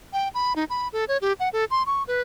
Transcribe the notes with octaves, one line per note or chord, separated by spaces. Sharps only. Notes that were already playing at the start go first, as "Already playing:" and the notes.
G5
B5
D#4
B5
A4
C#5
G4
F#5
A4
C6
C#6
B4